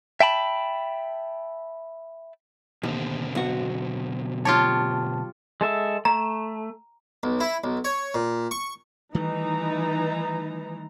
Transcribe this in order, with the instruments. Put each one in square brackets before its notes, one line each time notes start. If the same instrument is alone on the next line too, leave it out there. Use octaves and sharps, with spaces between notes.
[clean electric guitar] E5 G5 A5 B5
[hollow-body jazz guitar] D#2 [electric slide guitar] B2 D3 C4
[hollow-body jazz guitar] B1 F#4
[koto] F4 G4 C#5 [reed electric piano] A5
[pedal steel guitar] G#3 A4 E5
[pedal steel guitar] A3 [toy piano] A#5
[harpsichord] B1
E4
B1
C#5
A#2
C#6
[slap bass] D#3 G3 A3 [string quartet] E3 [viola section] D#4 B4 A#5